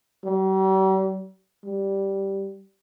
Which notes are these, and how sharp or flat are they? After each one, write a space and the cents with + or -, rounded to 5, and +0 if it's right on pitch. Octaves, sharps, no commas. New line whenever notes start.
G3 -45
G3 -5